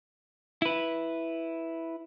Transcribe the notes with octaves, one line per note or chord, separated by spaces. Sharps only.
E4 B4